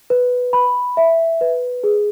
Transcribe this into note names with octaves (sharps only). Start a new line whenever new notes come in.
B4
B5
E5
B4
G#4